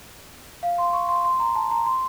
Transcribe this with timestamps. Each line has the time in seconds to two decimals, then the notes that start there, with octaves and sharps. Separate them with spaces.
0.63 F5
0.78 C6
0.93 C#6
1.09 C6
1.25 C6
1.40 A#5
1.55 A5
1.71 A#5
1.86 C6